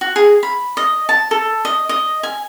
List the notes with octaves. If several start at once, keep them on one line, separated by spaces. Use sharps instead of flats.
F#4
G#4
B5
D#5
A5
A4
D#5
D#5
G#5